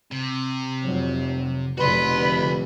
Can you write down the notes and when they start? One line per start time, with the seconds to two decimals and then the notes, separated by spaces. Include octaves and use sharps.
0.11 C3
0.83 F1 F#3
1.77 F1 B2 D3 F#4 B4 C6